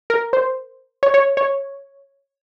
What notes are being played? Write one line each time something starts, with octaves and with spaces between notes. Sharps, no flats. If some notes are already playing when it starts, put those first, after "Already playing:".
A#4
C5
C#5
C#5
C#5